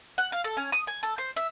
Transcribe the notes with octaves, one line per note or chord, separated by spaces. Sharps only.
F#5
F5
A4
C#4
D#6
G#5
A4
C5
E5